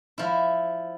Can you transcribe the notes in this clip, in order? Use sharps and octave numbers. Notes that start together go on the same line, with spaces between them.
F3 E4